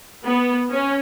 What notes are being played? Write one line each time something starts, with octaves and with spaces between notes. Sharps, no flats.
B3
C#4